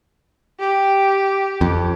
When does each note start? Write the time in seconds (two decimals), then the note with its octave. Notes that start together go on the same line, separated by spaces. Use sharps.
0.60 G4
1.61 F2